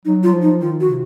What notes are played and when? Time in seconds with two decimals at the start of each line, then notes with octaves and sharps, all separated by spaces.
0.05 F#3 D#4
0.23 F4
0.27 F#3
0.33 F3
0.42 D#4
0.61 D#3 F4
0.80 F#4
0.90 C3